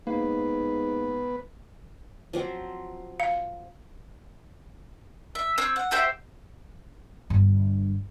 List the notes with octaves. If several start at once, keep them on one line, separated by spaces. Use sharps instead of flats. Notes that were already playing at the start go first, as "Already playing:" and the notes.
G#2 A#3 B3 B4
F3 F#3 C4
F5
E5
C4 C#5 E6
F#5
F#4 G4 C5 E5
G1 G2